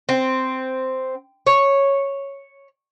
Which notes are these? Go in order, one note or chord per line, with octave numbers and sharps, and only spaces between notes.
C4
C#5